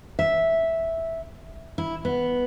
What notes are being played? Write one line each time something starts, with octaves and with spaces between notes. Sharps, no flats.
E5
E4
B3